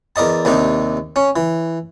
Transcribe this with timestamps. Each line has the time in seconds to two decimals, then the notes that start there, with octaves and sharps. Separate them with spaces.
0.16 E2 A#4 D5 D#5 A5
0.45 D#2 C3 D4 D#4
1.16 C#4
1.36 E3